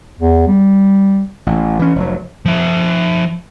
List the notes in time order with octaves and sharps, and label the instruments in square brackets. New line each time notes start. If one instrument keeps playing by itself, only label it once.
[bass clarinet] E2
G3
[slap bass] A1
E3 C#4
F1 F#3
[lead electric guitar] F3 E5